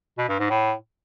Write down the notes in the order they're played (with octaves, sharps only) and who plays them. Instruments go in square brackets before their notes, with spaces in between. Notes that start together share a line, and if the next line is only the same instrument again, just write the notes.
[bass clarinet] B2
G2
G#2
A2